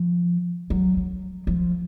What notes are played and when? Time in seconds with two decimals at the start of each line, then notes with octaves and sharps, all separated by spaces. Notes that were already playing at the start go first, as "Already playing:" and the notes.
Already playing: F3
0.70 F#3
0.97 F#3
1.47 F3